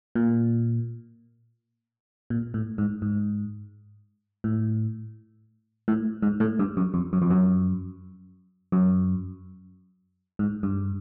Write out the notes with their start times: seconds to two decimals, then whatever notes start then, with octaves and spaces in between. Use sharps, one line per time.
0.15 A#2
2.30 A#2
2.54 A2
2.78 G#2
3.02 G#2
4.44 A2
5.88 A2
6.22 G#2
6.40 A2
6.59 G2
6.77 F#2
6.94 F2
7.13 F#2
7.22 F2
7.30 F#2
8.72 F#2
10.39 G#2
10.63 G2